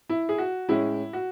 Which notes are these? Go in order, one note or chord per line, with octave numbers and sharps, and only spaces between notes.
E4
G#4
F#4
A2 G#3 C#4 E4
F#4